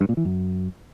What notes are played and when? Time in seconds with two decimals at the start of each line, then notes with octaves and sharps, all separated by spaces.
0.01 G2
0.09 A#2
0.17 E3
0.25 F#2